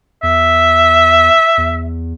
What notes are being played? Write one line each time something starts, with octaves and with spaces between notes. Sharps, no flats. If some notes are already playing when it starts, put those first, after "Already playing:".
E2 E5
E2